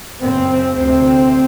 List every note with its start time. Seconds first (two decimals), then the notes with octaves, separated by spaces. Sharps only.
0.23 F#2 C#3 C4
0.77 D2 C3 C4